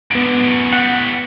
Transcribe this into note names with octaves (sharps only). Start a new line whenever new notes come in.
G#2 D3 B3 D7
F#2 A2
A2 G3 F#5